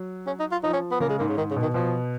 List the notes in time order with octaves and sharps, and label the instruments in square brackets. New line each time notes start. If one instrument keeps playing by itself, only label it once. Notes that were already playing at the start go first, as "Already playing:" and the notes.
Already playing: [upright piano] F#3
[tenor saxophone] C#4
D#4
F4
[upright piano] F3 [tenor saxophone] D#4
[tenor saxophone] C#4
B3
[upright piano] C#3 [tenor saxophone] A#3
[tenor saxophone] G#3
[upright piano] G#2 [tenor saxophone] A#3
[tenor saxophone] C#3
[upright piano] G#2 [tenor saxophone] D#3
[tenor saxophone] C#3
[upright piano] B2
[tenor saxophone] D#3
[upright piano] B2 [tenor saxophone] F3